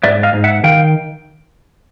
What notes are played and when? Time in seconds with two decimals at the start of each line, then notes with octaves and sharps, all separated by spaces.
0.03 G#2 D5 E5
0.23 D#5 F5
0.33 G#2
0.44 E5 F#5
0.64 D#3 F5 G5